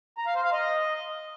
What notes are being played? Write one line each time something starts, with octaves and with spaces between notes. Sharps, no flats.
A#5
F5
C5
F5
D#5